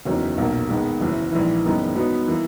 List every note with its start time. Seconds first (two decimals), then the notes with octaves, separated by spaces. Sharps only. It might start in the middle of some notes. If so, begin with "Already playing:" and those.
0.05 F#1 E2 D#3 F#3 C#4
0.38 B1 A#2 A#3
0.69 D#3 G#3 B3
1.01 F#1 F#2 E3
1.32 A#1 G#2 E3
1.64 F#1 F#2 D#3 G#3 B3
1.96 G#2 F#3 B3 D#4
2.27 E3 A#3